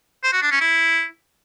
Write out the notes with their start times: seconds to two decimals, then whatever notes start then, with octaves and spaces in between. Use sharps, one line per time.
0.23 C5
0.33 F#4
0.42 D4
0.51 C#4
0.61 E4